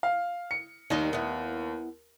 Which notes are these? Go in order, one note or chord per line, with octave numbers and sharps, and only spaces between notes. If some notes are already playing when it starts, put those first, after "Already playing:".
F5
C#7
D#2 D#3 G3 D#4
B3 E4